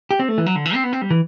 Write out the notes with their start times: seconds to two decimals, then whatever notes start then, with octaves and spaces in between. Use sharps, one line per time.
0.11 G4
0.19 C4
0.28 A3
0.38 E3
0.46 F#3
0.56 D3
0.66 E3
0.74 C4
0.84 B3
0.93 C4
1.02 G3
1.11 E3